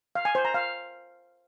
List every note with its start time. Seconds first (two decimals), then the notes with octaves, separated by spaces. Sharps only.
0.15 F5
0.25 G#5
0.35 C5
0.45 A#5
0.54 F5